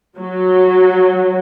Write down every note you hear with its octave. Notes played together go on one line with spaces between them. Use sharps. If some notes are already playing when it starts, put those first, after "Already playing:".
F#3